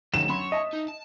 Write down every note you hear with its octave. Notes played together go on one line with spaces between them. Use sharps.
D2 D#3 F3 G#3 C#4 E7
F#2 C#5 B5 C6
D#5 E5 A5
D#4
A5